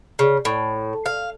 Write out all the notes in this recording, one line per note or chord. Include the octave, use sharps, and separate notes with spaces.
C#3
A2
F5